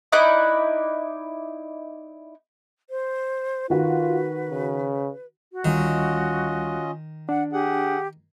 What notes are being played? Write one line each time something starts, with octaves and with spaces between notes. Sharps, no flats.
D#4 E4 D5 F#6
C5
D#3 F4 F#4 B4
C#3
F#4
D2 D#3 G3 C#4 F4 D#5
D4 F#5
G4 G#4 F#5